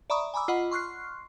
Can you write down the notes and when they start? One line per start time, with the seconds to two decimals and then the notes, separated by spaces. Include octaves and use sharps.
0.10 D5 E5 A#5 B5 C#6 D#6
0.34 G#5 A#5 B5 D6 E6
0.48 F4 D#5 F#5 B5
0.71 C6 C#6 F6 F#6 C7